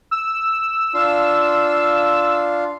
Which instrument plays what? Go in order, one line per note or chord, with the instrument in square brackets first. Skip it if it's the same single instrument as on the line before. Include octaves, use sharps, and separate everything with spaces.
[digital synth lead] E6
[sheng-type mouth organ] D4 F4 F5